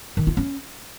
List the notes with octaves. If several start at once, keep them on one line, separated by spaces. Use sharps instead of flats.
D#3
F4
C#4